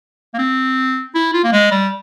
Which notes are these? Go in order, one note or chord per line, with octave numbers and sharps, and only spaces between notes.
A#3
C4
E4
F4
A#3
G#3
G3